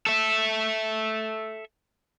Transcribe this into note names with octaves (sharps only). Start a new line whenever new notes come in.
A4 E5